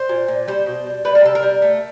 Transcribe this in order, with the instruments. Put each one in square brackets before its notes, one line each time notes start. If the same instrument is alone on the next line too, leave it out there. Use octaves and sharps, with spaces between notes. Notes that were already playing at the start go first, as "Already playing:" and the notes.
Already playing: [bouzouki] C5
A#2
A#2
G3 C5
B2
G3
G3 B4
A#4
C3 A4
A#4
G3
A3